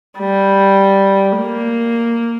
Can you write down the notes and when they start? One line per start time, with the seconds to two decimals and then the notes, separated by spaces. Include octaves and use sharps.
0.19 G3
1.38 A#3